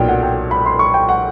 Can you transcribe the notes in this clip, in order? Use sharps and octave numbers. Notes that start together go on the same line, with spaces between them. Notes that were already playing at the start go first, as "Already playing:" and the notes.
Already playing: B1 A#2 F#3 G5
F#5
G5
B5
C6
C#6
G5
F#5